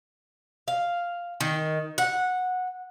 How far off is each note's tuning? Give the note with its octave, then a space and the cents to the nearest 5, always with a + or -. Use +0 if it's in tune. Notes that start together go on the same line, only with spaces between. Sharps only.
F5 +0
D#3 +5
F#5 -15